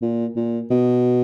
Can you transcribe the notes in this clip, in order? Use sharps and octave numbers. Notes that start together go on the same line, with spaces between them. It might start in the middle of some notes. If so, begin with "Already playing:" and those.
A#2
A#2
B2